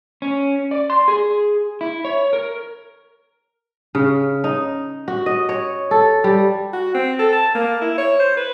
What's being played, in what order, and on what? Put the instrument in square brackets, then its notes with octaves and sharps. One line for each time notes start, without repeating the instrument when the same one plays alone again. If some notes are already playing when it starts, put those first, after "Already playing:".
[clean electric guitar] C#4
D5
C6
G#4
E4
C#5
A#4
[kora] C#3
D#4
F#4
D#5
C#5
A4
G3
[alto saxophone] F#4
C4
A4
A5
A#3
E4
C#5
C5
B4